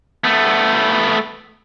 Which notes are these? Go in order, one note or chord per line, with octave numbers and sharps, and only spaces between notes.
A3 B3